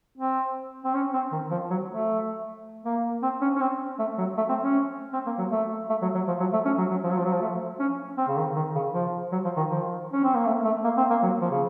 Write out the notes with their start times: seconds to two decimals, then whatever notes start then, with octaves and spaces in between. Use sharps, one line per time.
0.18 C4
0.84 C4
0.94 C#4
1.14 C4
1.32 D#3
1.51 F3
1.70 F#3
1.89 A3
2.85 A#3
3.23 C4
3.41 C#4
3.56 C#4
3.60 C4
3.99 A3
4.18 F#3
4.37 A3
4.49 C4
4.62 C#4
5.13 C4
5.26 A#3
5.38 F#3
5.51 A3
5.89 A3
6.02 F#3
6.14 F#3
6.28 F3
6.40 F#3
6.53 A3
6.65 C#4
6.78 F#3
6.91 F#3
7.03 F3
7.10 F#3
7.18 F3
7.25 F#3
7.32 F3
7.41 A3
7.80 C#4
8.17 C4
8.28 C#3
8.37 D#3
8.55 D#3
8.75 C#3
8.94 F3
9.32 F#3
9.45 F3
9.57 D#3
9.70 F3
10.13 C#4
10.24 C4
10.35 A#3
10.46 A3
10.65 A3
10.84 A#3
10.97 C4
11.10 A#3
11.23 F#3
11.41 F3
11.51 C#3